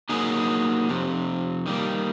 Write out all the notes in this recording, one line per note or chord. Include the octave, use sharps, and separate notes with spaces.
F#3 A#3 D#4 G#4
F2 C3
D#3 G3 A#3